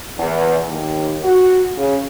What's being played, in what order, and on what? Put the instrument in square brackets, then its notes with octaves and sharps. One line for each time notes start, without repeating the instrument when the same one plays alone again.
[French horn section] E2
D#2
F#4
C#3